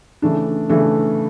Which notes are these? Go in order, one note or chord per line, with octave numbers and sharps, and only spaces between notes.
C#3 E3 A3 D4
C#3 E3 A3 D4